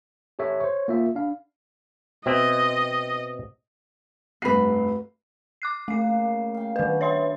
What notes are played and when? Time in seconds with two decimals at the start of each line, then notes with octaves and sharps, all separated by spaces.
0.39 G4 A4 C#5 E5
0.60 C5 C#5
0.88 A#3 F4 E5
1.15 D4 F5
2.26 B2 C4 D#5 E5
4.42 F1 G2 F#4 B4 C7
5.62 D6 F#6 C7
5.88 C#3 A3 A#3 C7
6.54 F5 G5
6.76 D#3 B3 D4 F#4 B4
7.01 C#5 E5 C6